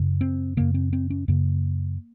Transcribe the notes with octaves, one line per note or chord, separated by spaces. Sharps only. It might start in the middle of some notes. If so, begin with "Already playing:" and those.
Already playing: F#2 C#3
C4
F#2 C#3 A#3
C4
C4
C#4
F#2 C#3 A#3